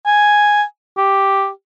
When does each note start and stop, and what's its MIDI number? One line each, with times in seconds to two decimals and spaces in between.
0.06 0.63 80
0.98 1.49 67